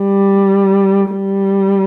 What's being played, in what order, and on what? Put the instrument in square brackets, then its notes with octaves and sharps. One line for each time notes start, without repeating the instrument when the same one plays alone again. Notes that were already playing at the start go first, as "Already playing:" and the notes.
Already playing: [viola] G3
G3